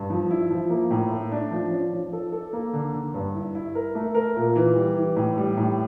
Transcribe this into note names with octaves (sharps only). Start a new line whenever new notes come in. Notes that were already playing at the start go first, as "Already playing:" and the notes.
Already playing: G2
F3
E4
F3
A#3
A2
A3
D4
F3
C#4
F3
A4
A4
A#3
D3
D3
G2
E4
E4
A#4
A3
A#4
A#2
E3
G3
E3
A2
G3
A2